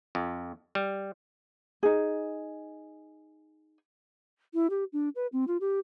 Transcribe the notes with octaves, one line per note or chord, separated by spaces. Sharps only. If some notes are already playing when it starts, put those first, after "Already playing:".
F2
G3
D#4 G#4
E4
G4
D4
B4
C4
F4
G4